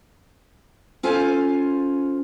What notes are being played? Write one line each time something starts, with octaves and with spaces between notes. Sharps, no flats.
C#4 F4 A4 C5 G#5